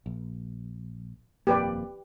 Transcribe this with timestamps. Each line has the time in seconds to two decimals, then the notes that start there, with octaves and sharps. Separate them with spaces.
0.06 A#1
1.47 D#1 F2 A#3 G4 B4 D5